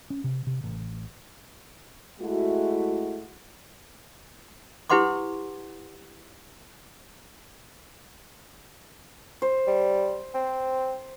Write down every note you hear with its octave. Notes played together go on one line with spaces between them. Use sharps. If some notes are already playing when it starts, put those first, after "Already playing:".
C#4
C3
C3
A1
G#3 A3 E4 F#4
E4 G4 B4 F#5 C6 D6
C5
G3
C4